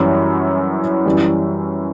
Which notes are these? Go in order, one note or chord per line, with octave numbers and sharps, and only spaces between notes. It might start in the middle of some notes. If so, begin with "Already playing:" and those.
Already playing: F#2 E3 G3 C#4 E4
F#2 E3 G3